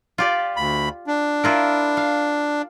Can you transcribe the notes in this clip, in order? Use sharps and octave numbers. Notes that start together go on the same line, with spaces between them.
F4 G4 D5
D2 B5
D4
E4 F4 A#4
F5